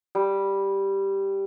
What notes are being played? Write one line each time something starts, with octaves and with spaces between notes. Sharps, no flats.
G3